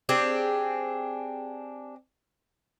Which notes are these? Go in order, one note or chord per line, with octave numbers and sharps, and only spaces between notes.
C4 D4 G4 G#4